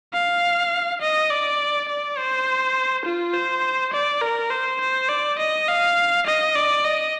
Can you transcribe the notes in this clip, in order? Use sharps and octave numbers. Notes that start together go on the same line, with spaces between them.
F5
D#5
D5
D5
C5
F4
C5
D5
A#4
C5
C5
D5
D#5
F5
D#5
D5
D#5